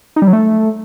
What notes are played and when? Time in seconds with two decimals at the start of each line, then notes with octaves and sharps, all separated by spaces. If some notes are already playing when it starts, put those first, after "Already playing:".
0.16 D#4
0.22 G3
0.28 F#3
0.33 A3